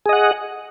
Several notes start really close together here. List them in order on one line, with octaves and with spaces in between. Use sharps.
G#4 D#5 F#5